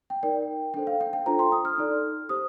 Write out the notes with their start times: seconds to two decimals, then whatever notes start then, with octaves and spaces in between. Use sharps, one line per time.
0.10 G5
0.23 D#4 A#4 D5 G5
0.74 D4 A4 C5 G5
0.87 F5
1.01 G5
1.13 G5
1.26 D4 F4 A4 C5 A#5
1.39 C6
1.52 D#6
1.65 F6
1.78 D#4 A4 D5
2.29 G4 C5 D#6